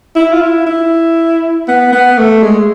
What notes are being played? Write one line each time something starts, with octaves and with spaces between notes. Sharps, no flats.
E4
F4
E4
E4
B3
B3
A3
G#3